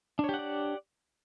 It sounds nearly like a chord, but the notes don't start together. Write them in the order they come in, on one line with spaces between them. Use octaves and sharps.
D4 C#5 G4 F#5 D5